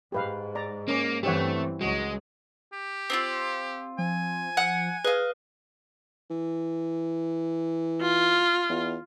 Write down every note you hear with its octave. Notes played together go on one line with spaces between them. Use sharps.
G#2 G4 B4 F5
D5 A#5
A#3 C#4 D6
G2 E3 A3 C4 G4 C#5 F#5
C#2 F#3 G#3 F#4
G4
C4 D4 F4
F3 G#5
F#5
G#4 B4 D#5 F5
E3
F4
E2